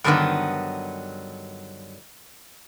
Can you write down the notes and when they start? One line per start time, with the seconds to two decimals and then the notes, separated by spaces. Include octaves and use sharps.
0.04 G2 D3 D#3 F#3 B3 D#4